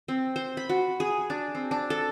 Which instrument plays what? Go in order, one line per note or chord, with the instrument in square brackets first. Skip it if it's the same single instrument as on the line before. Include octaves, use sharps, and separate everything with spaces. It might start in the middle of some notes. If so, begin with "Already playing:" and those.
[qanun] C4
C5
B5
F#4
G#4
D4
C4
D4
A4